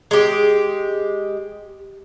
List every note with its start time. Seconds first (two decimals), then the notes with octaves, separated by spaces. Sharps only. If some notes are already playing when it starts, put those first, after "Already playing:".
0.11 G#3 G4